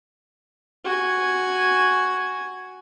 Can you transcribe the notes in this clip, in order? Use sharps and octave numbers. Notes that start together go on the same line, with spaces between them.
F#4 G#5